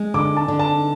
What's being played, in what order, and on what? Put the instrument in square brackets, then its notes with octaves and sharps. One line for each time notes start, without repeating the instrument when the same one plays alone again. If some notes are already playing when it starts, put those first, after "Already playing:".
Already playing: [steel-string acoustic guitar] G#3
[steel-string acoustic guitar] D3 [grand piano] D6
[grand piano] A5
[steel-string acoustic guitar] D3
[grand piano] A5